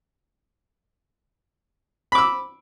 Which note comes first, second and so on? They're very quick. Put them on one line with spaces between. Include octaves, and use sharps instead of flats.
B5 D6 E6